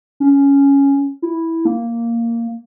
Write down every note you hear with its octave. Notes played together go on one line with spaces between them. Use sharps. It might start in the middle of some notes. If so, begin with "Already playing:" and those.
C#4
E4
A#3